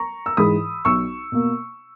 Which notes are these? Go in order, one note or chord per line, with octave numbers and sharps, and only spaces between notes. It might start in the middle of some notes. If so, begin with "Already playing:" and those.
Already playing: A#5 C#6
E6
G#2 E3 G#3 B5 D#6
B1 C#6 E6
B2 A#3